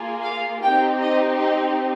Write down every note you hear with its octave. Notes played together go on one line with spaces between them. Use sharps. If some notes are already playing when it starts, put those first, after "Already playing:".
Already playing: A#3 F4 G#4
F5
C4 D#4 G4 G5
D#5
D#5